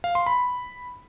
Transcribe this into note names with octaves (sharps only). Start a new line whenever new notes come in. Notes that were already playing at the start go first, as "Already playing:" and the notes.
F5
C6
B5